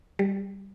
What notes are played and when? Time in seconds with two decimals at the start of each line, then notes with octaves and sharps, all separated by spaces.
0.19 G3